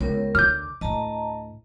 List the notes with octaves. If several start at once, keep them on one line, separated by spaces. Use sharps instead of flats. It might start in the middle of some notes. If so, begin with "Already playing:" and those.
C#2 B3 A#4 C#5
D2 D3 D6 F6 G6
D2 A2 D#5 A5 A#5